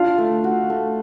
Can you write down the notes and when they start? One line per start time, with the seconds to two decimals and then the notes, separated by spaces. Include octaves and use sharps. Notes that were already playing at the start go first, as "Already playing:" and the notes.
Already playing: D4 F4 F5
0.18 A3
0.44 F#4
0.70 A3